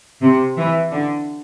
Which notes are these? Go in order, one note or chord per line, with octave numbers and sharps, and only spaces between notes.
C3
E3
D3